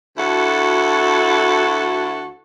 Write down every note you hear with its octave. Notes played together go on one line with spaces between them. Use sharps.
D2 E4 F#4 A4